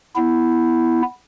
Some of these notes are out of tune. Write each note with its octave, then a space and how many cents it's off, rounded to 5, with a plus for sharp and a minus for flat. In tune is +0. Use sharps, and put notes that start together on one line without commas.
B3 +0 E4 +0